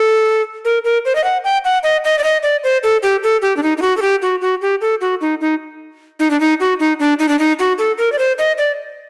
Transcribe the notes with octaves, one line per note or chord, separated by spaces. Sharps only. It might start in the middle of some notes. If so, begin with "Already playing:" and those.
Already playing: A4
A#4
A#4
C5
D#5
F#5
G5
F#5
D#5
D#5
D5
D#5
D5
C5
A4
G4
A4
G4
D4
D#4
D#4
F#4
A4
G4
F#4
F#4
G4
A4
F#4
D#4
D#4
D#4
D4
D#4
F#4
D#4
D4
D#4
D4
D#4
F#4
A4
A#4
D5
C5
D#5
D5